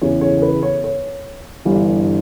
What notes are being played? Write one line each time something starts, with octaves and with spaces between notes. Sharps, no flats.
E2 C#3 E3 C#5
C#5
C#5
B4
C#5
C#5
G1 G2 E3